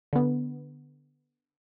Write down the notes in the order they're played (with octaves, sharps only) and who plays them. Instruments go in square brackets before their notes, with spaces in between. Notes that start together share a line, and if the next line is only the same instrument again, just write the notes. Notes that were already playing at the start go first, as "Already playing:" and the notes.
[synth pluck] D3 B3